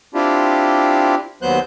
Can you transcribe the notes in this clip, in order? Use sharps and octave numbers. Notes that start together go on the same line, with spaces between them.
C4 D4 E4 F4 G4
D#2 F#3 B3 C5 F#6 G6